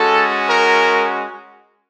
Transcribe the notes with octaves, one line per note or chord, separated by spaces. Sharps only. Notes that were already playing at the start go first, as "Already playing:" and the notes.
Already playing: G#3 C#4 F#4 A4
A#4